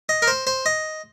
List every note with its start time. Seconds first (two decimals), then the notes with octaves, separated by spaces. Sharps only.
0.09 D#5
0.22 A#4
0.27 C5
0.47 C5
0.66 D#5